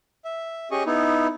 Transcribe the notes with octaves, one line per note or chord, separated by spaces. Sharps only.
E5
C#4 G4 G#4 D#5 C#6
B3 D#4 E4